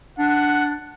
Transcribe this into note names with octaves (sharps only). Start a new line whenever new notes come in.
D4 F#5